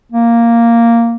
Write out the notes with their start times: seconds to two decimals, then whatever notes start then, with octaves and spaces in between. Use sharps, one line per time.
0.12 A#3